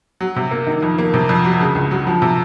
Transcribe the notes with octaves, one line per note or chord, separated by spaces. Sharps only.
F#3
C3
A#3
D#3
F2
A#3
C3
F2
F#3
C#3
C#2
F#3
F3
C3